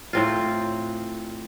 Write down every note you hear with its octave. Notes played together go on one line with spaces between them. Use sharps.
A2 C4 F4